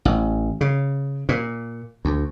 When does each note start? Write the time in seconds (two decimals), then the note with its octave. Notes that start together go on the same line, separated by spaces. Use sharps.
0.05 A1
0.61 C#3
1.29 A#2
2.05 D2